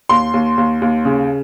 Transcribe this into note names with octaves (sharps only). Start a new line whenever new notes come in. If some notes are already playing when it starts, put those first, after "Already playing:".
D#2 C6
D#2
D#2
D#2
C#3